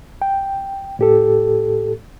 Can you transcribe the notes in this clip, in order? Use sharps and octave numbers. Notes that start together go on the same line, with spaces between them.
G5
A2 G4 A4